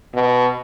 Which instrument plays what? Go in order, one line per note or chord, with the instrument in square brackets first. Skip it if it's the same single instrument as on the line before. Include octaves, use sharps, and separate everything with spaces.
[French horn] B2